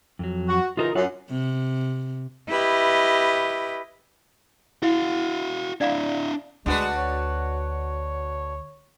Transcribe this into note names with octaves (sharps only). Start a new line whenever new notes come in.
F2 F#3
F#4
C#3 E3 D#4 F4 F#4 A#4
F#2 F4 F#5
C3
E4 G4 B4 D#5
E4 F#4 F5
D4 E4 D5 F5 A#5
D2 G#3 D4 F#4 B4
C#5